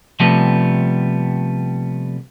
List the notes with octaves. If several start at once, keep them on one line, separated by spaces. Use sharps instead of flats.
C3 F3 G3 A3 B3